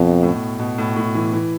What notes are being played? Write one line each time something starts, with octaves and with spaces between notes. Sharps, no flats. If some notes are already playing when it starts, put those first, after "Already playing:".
Already playing: F2 B2
A2
B2
A2
A2
E3
E3